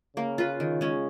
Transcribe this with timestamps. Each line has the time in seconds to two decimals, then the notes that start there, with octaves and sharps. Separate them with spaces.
0.16 C#3 A#3
0.38 F4 B4
0.60 D#3
0.81 G#3 C#4